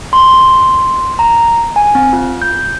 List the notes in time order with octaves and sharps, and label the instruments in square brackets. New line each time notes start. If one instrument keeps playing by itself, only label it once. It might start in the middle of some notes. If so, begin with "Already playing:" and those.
[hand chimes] C6
A#5
G#5
C4
F4
G6